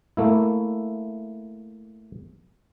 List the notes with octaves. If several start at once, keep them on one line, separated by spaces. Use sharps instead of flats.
A3 A#3 E4